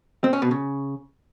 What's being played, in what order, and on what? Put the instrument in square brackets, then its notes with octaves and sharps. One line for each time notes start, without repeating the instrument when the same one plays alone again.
[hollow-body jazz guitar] C4
C#4
B2
C#3